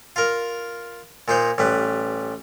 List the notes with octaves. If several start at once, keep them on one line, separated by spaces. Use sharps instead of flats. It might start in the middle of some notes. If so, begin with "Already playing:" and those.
F4 A#4
A#2 D#4 C5
A1 G3 B4